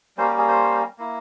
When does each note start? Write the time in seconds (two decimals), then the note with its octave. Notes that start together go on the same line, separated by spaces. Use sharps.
0.17 G3 A#3 C#4 C5
0.28 G4
0.38 G#4
0.48 C5
0.98 A#3 E4